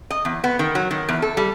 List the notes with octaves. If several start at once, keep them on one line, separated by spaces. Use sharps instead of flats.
D#5
E2
B3
D#3
F#3
D#3
E2
A4
G3